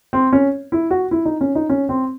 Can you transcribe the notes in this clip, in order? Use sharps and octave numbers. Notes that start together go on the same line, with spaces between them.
C4
C#4
E4
F#4
E4
D#4
C#4
D#4
C#4
C4